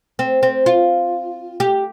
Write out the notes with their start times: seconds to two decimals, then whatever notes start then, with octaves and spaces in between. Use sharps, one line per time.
0.19 C4
0.43 C4
0.66 F4
1.60 G4